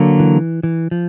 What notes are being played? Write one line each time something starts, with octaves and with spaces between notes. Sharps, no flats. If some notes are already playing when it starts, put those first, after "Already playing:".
Already playing: D3 F#3 A#3
E3
E3
F3